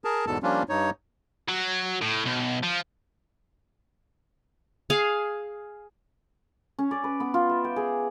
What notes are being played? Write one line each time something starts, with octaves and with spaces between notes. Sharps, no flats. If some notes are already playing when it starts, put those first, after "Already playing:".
G#4 A#4 A5
E2 G#2 B2 A4 A5
F3 G3 A#3 C#4 D4 F4
G2 D#4 C#5
F#3
A2
B1
F3
G#4 F5
C#4
D5
B4
B3
F4
E5
G5
G#4